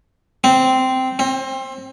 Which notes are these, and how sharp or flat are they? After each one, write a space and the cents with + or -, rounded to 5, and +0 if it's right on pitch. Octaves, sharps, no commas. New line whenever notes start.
C4 -10
C4 +25